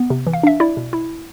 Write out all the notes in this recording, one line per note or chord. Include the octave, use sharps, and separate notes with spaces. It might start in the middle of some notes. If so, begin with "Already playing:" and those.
Already playing: B3
C3
E3
F5
D4 E5
E4 D5
B2
E4